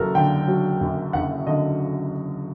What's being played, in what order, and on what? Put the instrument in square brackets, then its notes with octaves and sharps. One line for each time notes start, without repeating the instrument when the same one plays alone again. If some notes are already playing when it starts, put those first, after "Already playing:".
Already playing: [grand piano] F#1 F#3 A4 A#4
D3 G5
F#3
F#2
F#1 F#5
D3 D#5